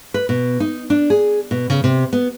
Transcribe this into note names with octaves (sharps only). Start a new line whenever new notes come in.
B4
B2
D#4
D4
G#4
B2
C#3
C3
B3